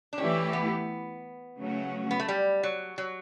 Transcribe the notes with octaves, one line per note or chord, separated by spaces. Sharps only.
D4
E3 A3 C#4 E4 G4
B3
C#3 F#3 A3 C#4 F#4
B3
A3
G3
F#3
F#3